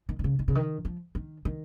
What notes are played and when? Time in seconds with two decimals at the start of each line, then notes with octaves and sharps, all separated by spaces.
0.09 D#3
0.19 D#3
0.24 C#3
0.39 D#3
0.48 C#3
0.55 D#3
0.85 F3
1.15 D#3
1.45 D#3